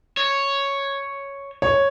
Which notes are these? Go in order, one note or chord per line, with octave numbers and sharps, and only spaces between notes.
C#5
C#5